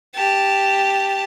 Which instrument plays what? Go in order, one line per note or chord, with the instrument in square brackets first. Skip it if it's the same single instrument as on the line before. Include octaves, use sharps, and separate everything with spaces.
[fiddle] G4 A5